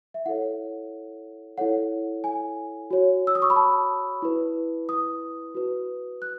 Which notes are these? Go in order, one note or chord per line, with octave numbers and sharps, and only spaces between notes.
E5
E4 A4 C#5 F#5
E4 A4 C#5 F#5
G#5
F#4 C#5
E6
D#6
C#6
B5
A5
E4 B4
D#6
F#4 B4
F#6